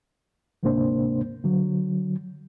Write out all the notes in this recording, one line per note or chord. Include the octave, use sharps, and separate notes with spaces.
D2 G#2 C3 A#3 D4 C5
D3 F#3